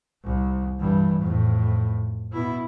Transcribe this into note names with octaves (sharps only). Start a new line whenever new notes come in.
C2
G2 E3
F2 A2
B2 E4